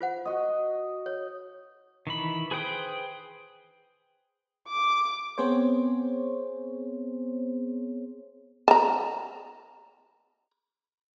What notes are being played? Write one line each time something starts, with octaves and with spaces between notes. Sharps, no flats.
F4 C5 F#5
F#4 D#5
C#5
D#3 E3 B5
G#4 B4 C5 G5 D#6
D6
B3 C4 G#4 C5 C#5
A5 A#5